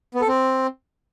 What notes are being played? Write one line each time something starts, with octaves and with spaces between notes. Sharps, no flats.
B3
A4
C4